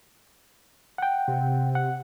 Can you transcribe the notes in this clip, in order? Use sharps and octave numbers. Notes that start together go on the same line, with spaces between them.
F#5 G5
C3
F#5